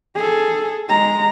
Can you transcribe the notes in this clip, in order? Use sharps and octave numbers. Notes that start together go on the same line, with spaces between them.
G#4 A4
G#3 A#5